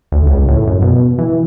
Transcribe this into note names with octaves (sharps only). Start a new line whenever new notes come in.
D2
C#2
A2
F#2
B2
E3